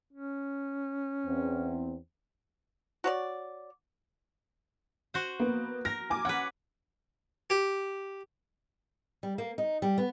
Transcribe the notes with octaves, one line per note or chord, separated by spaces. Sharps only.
C#4
E2 C4
F#4 C#5 D5
F#4 C5
A#3 B3
A#4 A#6
G#5 D6
C#4 B4 F#5
G4
G3
A#3
D#4
G3
B3